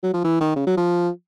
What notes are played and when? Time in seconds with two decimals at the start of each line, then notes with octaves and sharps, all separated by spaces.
0.03 F#3
0.14 F3
0.24 E3
0.41 D#3
0.56 C#3
0.67 F#3
0.77 F3